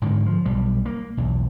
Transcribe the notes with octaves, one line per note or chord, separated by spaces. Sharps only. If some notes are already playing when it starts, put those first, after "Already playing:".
G#2 D3 D#3
F3
B1 G3
A#3
B1 E2